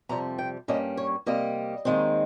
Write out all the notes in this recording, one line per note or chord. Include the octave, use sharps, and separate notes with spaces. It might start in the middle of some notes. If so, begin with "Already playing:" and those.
F2 C3 G3 A#5
G5
G2 G3 A#3 C#4 D#5
C#5
C3 G3 A#3 D#5
D#2 D#3 G#3 C4